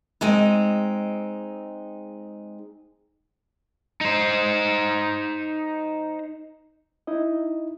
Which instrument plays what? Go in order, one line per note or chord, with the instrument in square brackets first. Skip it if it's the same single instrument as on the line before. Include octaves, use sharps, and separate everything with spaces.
[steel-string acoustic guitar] G#3 C4 D#4
[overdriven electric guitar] D#4 C5
[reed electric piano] D#4 E4 D#5